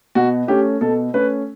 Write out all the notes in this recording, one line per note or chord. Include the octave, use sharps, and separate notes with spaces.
B2 F#4
A3 C#4 G4
B2 A4
A3 C#4 B4